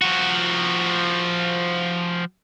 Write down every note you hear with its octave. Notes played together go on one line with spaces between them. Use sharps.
F3 F#4